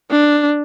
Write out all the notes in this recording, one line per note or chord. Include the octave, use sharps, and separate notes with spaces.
D4